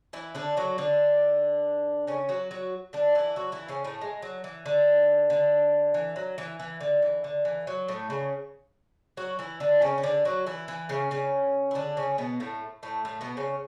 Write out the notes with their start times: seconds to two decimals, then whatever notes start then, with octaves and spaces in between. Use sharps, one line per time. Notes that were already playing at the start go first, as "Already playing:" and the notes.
0.13 E3 E4
0.35 D3 D4
0.57 F#3 F#4
0.78 D3 D4
2.07 C#3 C#4
2.29 F#3 F#4
2.51 F#3 F#4
2.93 D3 D4
3.15 E3 E4
3.36 F#3 F#4
3.52 E3 E4
3.68 C#3 C#4
3.84 A2 A3
4.01 G#3
4.22 F#3
4.44 E3
4.66 D3
5.30 D3
5.94 E3
6.16 F#3
6.38 E3
6.59 E3
6.80 D3
7.02 E3
7.24 D3
7.45 E3
7.67 F#3
7.88 A2 A3
8.10 C#3 C#4
9.17 F#3 F#4
9.39 E3 E4
9.60 D3 D4
9.82 C#3 C#4
9.98 C#4
10.03 D3 D4
10.25 F#3 F#4
10.47 E3 E4
10.68 E3 E4
10.89 C#3 C#4
11.11 C#3 C#4
11.71 E4
11.75 D3 D4
11.97 C#3 C#4
12.18 B2 B3
12.40 A2 A3
12.83 A2 A3
13.05 A2 A3
13.21 B2 B3
13.37 C#3 C#4